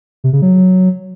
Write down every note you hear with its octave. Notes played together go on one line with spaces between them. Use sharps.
C3
C#3
F#3